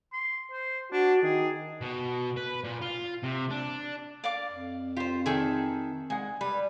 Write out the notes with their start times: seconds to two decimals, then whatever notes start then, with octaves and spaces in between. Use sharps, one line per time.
0.13 C6
0.52 C5
0.92 D4 F#4
1.23 D#3 G#4
1.81 B2
2.37 B4
2.64 A#2
2.81 F4
3.23 C3
3.50 D4
4.24 D5 F5 D6
4.52 F2
4.97 F4 G4 C5
5.26 D#3 G#4 A4 E5 G5
6.10 G#3 F#5 G#5
6.41 G3 B4